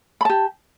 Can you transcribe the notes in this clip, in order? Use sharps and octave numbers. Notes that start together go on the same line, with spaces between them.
G4 A5 B5